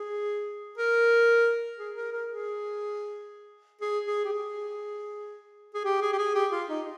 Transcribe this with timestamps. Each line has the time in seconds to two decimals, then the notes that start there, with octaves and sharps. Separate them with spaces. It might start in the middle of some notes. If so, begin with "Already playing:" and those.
Already playing: G#4
0.78 A#4
1.79 G#4
1.96 A#4
2.13 A#4
2.29 G#4
3.81 G#4
4.07 G#4
4.25 G4
4.33 G#4
5.74 G#4
5.85 G4
6.02 G#4
6.13 G4
6.18 G#4
6.35 G4
6.52 F4
6.69 D#4